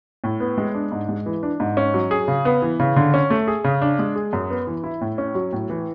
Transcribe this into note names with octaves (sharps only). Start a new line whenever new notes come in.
A2
B3
G#3
D4
G#2
G#3
E3
D4
G#2
C#4
F#3
G#4
C#3
B3
E3
C#3
D3
C#4
A3
G#4
C#3
D4
G#3
G#4
F#2
B3
E3
E4
A2
C#4
F#3
A2
E3